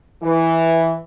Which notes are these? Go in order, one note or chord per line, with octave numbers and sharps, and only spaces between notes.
E3